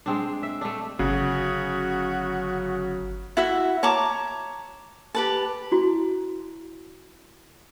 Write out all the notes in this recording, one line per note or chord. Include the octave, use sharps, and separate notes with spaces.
G#3 C4 D4
E5
A3 D4
G1 C#3 F#3 F#4
E4 F#4 E5
C#5 A5 A#5 D6
G4 B4 A5
E4 F#4